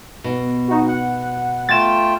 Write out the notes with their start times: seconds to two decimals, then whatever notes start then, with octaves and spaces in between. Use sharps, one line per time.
0.24 B2
0.68 D#4 F#4
0.87 F#5
1.69 A3 F4 G5 A6 E7